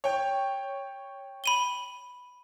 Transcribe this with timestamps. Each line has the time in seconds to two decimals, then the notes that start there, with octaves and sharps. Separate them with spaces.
0.04 C#5 G5
1.44 B5 D#7 G7